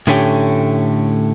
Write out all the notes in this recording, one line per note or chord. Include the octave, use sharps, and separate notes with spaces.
A2 D3 A3 C#4 G4